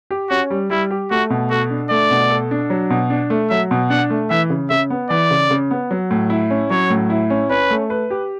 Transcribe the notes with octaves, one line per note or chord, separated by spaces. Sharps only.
G4
C#4 F#4
G3
G3 E4
G4
A3 F#4
B2
F#4 A4
D4
A3 D5
B2
A4
D4
F#3
B2
D4
A3
F#3 E5
B2
D4 F#5
A3
E3 E5
C#3
C#3 E5
B3
E3 D5
C#3
C#3
B3
F#3
A2
E4
C#4
F#3 C#5
A2
E4
C#4
C#4 B4
A3
B4
G4